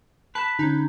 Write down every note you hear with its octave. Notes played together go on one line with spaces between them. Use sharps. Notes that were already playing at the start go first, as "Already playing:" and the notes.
B4 A5
D3 C#4 D#4